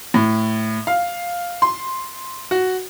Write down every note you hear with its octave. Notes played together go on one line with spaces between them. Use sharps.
A2
F5
C6
F#4